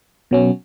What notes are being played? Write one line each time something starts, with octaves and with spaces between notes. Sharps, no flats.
B2 F#3 C#4